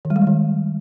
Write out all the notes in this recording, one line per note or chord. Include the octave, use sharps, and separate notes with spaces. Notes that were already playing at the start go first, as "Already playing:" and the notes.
D#3
G3
G#3
G3
D#3